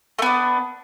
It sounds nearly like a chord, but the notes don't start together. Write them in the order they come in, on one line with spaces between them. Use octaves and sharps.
A3 B3 D4